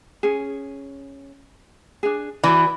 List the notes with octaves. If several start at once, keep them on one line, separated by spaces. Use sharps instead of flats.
C#4 G#4
D4 G#4
E3 F#4 D5